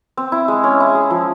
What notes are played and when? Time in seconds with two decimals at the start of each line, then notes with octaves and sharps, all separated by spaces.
0.17 C4
0.32 E4
0.48 G#3
0.64 C#4
0.80 E4
0.95 G#4
1.10 F3